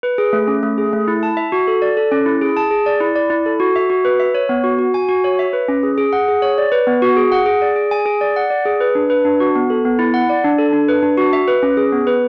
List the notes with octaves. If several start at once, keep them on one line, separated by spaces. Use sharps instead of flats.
B4
G#4
A3
C#4
A3
G#4
A3
E4
A5
E5
F#4
A4
D5
A4
C#4
E4
G#4
A5
G#4
D5
E4
D5
E4
A4
F#4
E5
F#4
B4
E5
C#5
B3
F#4
F#4
G#5
F#4
C#5
E5
B4
C#4
G#4
G#4
F#5
G#4
C#5
D5
B4
B3
F#4
G#4
F#5
G#4
D5
G#4
G#5
G#4
D5
F#5
D5
G#4
B4
D4
B4
D4
F#4
B3
A4
B3
E4
F#5
D5
D4
A4
D4
B4
D4
F#4
E5
B4
C#4
G#4
B3
B4